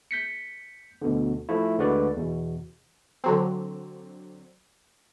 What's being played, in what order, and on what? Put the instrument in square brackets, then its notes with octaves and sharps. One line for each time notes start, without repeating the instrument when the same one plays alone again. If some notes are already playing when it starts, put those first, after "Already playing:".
[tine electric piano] G6 B6 C#7
D2 B2 D3
F3 A3 E4
D2 D3 G#3 F#4 B4 D5
E2 B2
[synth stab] D3 F#3 C4